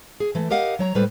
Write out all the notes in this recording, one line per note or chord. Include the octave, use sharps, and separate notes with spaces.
G#4
E3 A3
G4 A#4 D#5 F5 F#5
F#3 C#5 A#5
A2 G3 A4 B4 C5